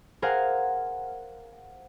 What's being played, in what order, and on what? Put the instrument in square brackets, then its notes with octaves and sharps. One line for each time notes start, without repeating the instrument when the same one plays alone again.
[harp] G#4 A#4 C5 F5 F#5 A#5